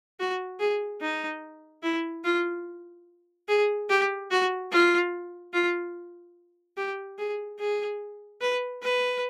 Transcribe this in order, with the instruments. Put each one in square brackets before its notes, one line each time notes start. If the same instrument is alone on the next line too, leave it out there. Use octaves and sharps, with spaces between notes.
[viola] F#4
G#4
D#4
E4
F4
G#4
G4
F#4
F4
F4
G4
G#4
G#4
B4
B4